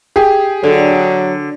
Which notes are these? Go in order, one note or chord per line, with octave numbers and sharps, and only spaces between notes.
G4 G#4
D3 F#3 A4